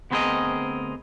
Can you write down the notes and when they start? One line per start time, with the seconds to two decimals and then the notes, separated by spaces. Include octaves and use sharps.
0.11 D2 B3 C4 G#4 A#4 D#5